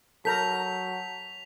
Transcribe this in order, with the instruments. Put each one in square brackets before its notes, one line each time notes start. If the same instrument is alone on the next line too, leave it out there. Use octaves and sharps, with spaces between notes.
[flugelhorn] F#3 [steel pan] A4 A#4 A#5 [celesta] A5 G6 [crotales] B6 F7